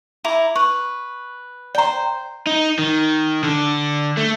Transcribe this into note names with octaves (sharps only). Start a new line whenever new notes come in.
E4 A#5 D6
B4 C#6
C5 D5 G5 A#5
D#4
D#3
D3
A3